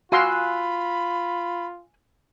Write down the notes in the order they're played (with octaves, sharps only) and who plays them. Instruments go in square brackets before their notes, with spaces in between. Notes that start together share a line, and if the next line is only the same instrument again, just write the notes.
[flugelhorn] F4 [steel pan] F#4 F5 C6 [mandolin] G#5 E6 F#6 [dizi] B5